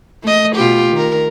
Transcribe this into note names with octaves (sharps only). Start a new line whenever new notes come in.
A3 D#5
B2 F4 G4
D#3 A#4